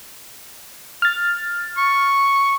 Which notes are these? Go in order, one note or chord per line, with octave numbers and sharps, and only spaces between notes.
F6 A6
C#6